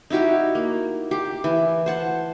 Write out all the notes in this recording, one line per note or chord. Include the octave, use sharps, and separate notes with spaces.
D#4 E4 F#4 G4
A#3
G4
E3
C5 F#5 A5